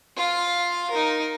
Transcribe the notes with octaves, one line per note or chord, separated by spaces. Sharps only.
F4 F5
D#4 A#4